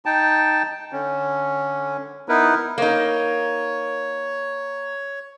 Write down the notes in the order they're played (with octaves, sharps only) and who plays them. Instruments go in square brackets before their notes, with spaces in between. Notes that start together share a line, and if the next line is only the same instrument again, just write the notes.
[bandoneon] D#4 G5 A5
D3 C#4
B3 D#4 E4 A#4 B4
[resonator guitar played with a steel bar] A#3 D#4 [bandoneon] C#5